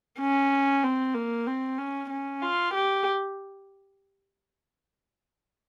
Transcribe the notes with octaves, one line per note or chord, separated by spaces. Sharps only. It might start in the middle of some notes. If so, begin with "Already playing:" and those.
C#4
C4
A#3
C4
C#4
C#4
F4
G4